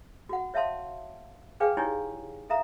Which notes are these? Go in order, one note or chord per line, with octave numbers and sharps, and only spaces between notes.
F#4 F#5
C#5 E5 F5 A5 C6
G#4 B4 D5 F5 G5 G#5
D#4 E4 G4 C#5 D5 G#5
A4 E5 F5 A#5